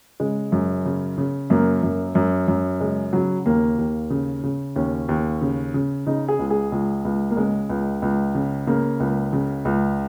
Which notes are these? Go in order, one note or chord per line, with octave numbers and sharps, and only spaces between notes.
C#3 G#3
F#2
C#3
C#3
F#2 A#3
F#2
F#2
F#2
C#3 G#3
C#3 F#3
D#2 A#3
D#2
C#3
C#3
D#2 C#4
D#2
C#3
C#3
C#3 D#4
G#4
C#2
G#4
C#2
C#2
A#3
C#3 G#3
C#2
C#2
C#3
C#3 A#3
C#2
C#3
C#2